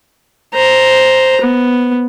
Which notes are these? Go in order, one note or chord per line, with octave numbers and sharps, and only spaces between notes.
C5 A#5
B3